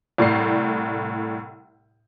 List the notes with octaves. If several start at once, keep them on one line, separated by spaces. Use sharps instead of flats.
C2 A2 D5 C7